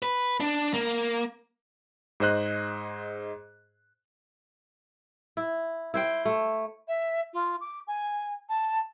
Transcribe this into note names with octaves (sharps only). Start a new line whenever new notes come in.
B4
D4
A#3
G#2 G#4 C5 D#5 F#6
E4
E4 C5 G5
A3
E5
F4
D6
G#5
A5